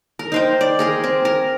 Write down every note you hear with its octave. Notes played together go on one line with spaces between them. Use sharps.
A#4
D#4 C5 G5
D5
G#4 A#4 G5
C4
A#4